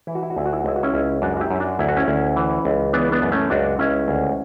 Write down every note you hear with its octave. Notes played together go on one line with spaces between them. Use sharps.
E3 E4
F#4
E4
F#4
D2 E4
F#4
E4
F#4
C#2 E4
F#4
C#4 E4
C#2
F#2 D4 F#4
F#4
E4 G4
F#2
D4 F#4
D2 E4
F#4
C#4 E4
D2
E3
C#2
E3 B3 D4
B3 D4
F#2
A3 C#4
C#2 D4 F#4
C#2 C#4 E4
D2